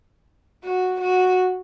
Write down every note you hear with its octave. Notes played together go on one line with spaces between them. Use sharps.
F#4
F#4